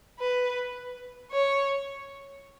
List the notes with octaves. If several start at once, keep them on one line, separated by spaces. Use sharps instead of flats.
B4
C#5